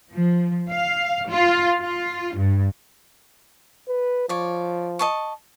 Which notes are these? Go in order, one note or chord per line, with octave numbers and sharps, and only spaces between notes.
F3
F5
F4
F4
G2
B4
F3 C#5 D5
D#5 A5 C#6